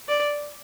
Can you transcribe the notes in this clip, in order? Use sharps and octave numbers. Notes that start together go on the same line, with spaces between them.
D5